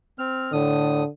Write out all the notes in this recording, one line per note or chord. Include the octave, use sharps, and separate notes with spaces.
C4 F6
A2 D3 D#6